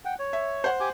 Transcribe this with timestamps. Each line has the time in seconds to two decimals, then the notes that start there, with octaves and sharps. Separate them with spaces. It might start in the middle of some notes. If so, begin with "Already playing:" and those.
0.05 F#5 G5
0.19 C#5
0.33 E5
0.64 C5 F#5
0.80 G4 G#5 D6